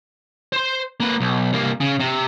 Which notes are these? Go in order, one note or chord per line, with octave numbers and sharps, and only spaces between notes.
C5 C6
A#3 B4
B1
C2 A#3
C#3
C3